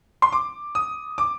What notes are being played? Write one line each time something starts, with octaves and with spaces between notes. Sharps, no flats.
C6
D6
D#6
D6